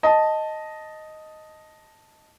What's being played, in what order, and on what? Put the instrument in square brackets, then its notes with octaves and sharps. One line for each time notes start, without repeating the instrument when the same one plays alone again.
[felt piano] D#5 A5